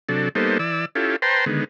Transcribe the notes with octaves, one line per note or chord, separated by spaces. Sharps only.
C3 F#3 D4 A4
G3 A#3 B3 D#4 A4 C5
E3 D5 E6
C#4 E4 F4 G4 A4
B4 C5 G5 A5 A#5 C6
D3 D#3 G#3 B3